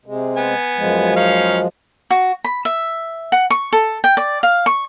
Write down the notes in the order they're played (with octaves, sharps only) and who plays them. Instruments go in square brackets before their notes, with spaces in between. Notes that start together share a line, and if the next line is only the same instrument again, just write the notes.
[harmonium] C3 G#3
[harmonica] B3 G#5
[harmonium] F#2 F3 G#3
[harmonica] C#4 D#4 F5
[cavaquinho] F#4
B5
E5
F#5
C#6
A4
G5
D5
F5
C#6